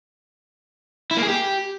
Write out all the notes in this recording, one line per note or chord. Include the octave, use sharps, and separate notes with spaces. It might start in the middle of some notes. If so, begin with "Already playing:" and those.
E4
A#3
G#4
G4